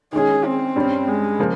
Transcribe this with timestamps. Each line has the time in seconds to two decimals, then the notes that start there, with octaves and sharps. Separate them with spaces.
0.13 D#3 G#3 C#4 G#4
0.45 C4
0.76 G2 G3 C#4
1.08 G#3
1.39 C#3 F3 A#3